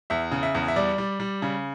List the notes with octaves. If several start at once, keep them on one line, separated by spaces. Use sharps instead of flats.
E2 E5
C#3
E5
E2
E5
G3 D5
G3
G3
C#3